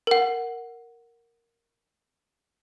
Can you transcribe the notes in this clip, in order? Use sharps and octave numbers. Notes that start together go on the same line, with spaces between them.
A#4 F#5